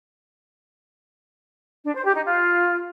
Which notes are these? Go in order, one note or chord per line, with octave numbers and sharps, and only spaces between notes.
D4
C5
G4
D#4
F4